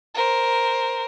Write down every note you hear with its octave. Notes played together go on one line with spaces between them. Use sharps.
A#4 C5